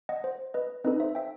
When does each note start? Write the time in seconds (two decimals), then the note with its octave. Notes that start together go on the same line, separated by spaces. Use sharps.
0.09 D#5 F#5
0.24 C5
0.54 B4 D#5
0.84 C4 D#4 A4 B4 D#5
1.00 C5 E5
1.15 E5 G5